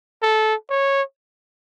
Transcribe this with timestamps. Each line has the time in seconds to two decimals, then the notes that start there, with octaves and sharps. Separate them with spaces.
0.22 A4
0.70 C#5